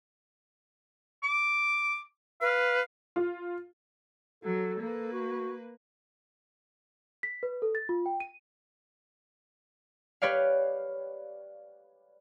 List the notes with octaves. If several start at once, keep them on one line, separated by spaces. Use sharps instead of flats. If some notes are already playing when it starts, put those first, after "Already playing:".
D6
B4 F5
F4
F#3 A4
A#3 A4 B4
F#4
B6
B4
A4
A6
F4
G5
D#7
G4 B4 C#5 D5 F5